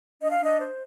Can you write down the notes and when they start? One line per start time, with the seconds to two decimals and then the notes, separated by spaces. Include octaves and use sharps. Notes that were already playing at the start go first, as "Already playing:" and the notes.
0.20 D4 D#5
0.32 F5
0.40 D4 D#5
0.60 C5